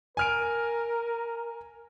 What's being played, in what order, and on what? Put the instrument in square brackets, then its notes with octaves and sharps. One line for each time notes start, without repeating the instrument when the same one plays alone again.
[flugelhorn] A#4 [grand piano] G#5 F6 D7